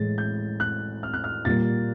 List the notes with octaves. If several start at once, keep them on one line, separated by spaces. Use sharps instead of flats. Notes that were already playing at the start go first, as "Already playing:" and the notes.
Already playing: A2 E3 G#3 A6
G6
F#6
F6
F#6
F6
A#2 G3 A#3 A6